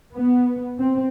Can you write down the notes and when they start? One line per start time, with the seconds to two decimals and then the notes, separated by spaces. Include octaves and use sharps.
0.13 B3
0.79 C4